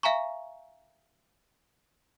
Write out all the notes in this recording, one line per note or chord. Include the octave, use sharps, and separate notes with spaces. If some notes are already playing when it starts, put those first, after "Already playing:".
E5 F5 G#5 A#5 C#6